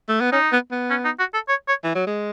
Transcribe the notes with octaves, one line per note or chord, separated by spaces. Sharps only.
A3
B3
C#4 D#4
B3
B3
C#4
D#4
F#4
A4
C#5
C#5
E3
F#3
G#3